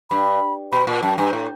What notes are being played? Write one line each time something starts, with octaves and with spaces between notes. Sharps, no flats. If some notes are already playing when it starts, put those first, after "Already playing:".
G2 B5
B2 B5
A#2
F#2 A5
G2 G#5
A2